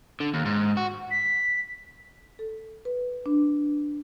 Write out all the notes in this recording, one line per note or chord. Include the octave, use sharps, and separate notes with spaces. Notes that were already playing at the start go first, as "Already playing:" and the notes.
D3
D#2
G#2
F#4
B6
A4
B4
D4